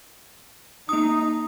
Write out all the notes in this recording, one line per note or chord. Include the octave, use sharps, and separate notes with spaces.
A#3 D#4 D#6